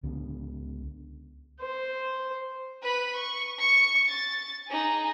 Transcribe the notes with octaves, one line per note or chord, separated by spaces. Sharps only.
C#2 D3 B3 D4
C5
B4 B5
C#6
C#6 C#7
A6
D#4 G#4